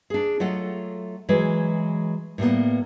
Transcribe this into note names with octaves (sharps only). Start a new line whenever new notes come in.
D4 G#4
F#3 A3 F4 A4 D#5 F#5
E3 F#3 G#3
A2 G3 A#3 B3